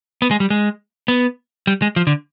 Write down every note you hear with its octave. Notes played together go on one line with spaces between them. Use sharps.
B3
G#3
G3
G#3
B3
G3
G#3
F3
D3